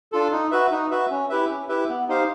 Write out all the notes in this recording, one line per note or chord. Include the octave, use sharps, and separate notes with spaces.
D4 F4 A4
D#4
F#4 B4 E5
D#4
F#4 B4 E5
C#4
E4 G4 B4 E5
C#4
E4 G4 B4 E5
B3
D#4 G4 C5 F5